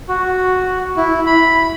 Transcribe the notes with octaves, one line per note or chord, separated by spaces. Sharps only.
F#4
E4
B5